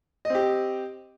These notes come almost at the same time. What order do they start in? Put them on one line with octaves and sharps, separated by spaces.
D#5 C4 G4